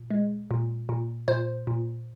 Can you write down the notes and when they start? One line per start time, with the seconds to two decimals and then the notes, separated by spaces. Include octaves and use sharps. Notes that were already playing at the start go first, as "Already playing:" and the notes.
Already playing: A#2
0.11 G#3
0.51 A#2
0.89 A#2
1.28 A#2 C5
1.67 A#2